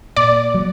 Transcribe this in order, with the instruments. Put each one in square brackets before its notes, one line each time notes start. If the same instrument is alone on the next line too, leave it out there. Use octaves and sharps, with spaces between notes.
[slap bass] A#2 [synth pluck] D5
[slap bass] F#3